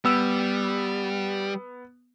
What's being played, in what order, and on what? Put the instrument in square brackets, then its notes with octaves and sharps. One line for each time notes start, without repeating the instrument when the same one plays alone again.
[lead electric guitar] G3 [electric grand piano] B3 E6